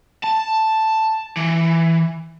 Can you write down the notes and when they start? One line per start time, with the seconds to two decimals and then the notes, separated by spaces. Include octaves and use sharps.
0.23 A5
1.37 E3